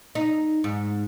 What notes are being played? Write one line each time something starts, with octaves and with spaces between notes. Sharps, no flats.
D#4
G#2